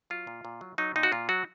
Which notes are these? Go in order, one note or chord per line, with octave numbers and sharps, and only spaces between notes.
F#3 F4
A#2
A#2
F#3
F#3 D#4
A#2 D#4
F#4
A#2 F4
F#3 F#4